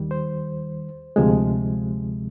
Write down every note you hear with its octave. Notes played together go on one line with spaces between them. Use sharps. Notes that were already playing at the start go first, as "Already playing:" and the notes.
Already playing: D#2 D#3 G3
C5
D2 C3 F3 G#3